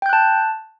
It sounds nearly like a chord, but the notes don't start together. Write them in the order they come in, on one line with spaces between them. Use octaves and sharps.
G5 G6 F#6 A5